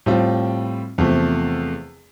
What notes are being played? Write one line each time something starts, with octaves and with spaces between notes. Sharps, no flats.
A2 G3 C4 F4
E2 C3 F3 A3